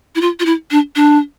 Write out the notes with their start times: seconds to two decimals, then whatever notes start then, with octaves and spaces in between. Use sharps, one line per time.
0.15 E4
0.21 F4
0.40 F4
0.46 E4
0.71 D4
0.96 D4